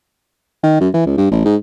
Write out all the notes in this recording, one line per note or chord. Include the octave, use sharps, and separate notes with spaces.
D#3
F#2
E3
C#2
G2
A1
G#2